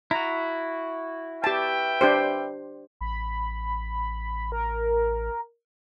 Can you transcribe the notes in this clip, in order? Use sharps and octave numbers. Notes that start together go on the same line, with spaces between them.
E4 F#4 A#5
G4 B4 E5 G5 A5
D4 G4 C5
A1 B5
A#4